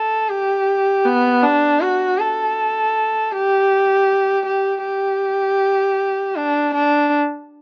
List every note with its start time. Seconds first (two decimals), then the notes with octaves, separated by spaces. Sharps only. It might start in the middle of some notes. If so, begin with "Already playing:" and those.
Already playing: A4
0.29 G4
1.05 B3
1.43 D4
1.81 F#4
2.19 A4
3.32 G4
4.46 G4
4.84 G4
6.36 D4
6.74 D4